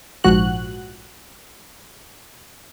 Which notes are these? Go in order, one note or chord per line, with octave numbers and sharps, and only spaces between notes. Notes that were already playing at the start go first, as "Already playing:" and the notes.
A#1 G#2 F3 F#4 F#6